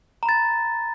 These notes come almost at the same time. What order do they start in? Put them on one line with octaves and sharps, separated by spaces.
A#5 B5 A6